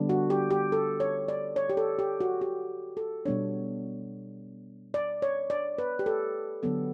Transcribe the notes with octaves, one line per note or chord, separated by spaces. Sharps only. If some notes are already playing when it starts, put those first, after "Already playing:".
Already playing: D3 G3 B3 D4
F#4
G4
G4
A4
C#5
D5
C#5
G4
A4
G4
F#4
G4
A4
B2 G3 B3 D4 C#5
D5
C#5
D5
B4
G4
A4
D3 F#3 B3 A4